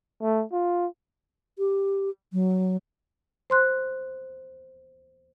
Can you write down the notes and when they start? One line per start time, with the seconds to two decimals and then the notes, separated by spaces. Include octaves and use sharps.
0.23 A3
0.52 F4
1.59 G4
2.33 F#3
3.50 C5 C6 F#6